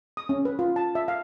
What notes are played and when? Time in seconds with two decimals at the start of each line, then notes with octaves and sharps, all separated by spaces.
0.17 D#6
0.29 C#4
0.45 B4
0.59 F4
0.76 A5
0.95 E5
1.08 F5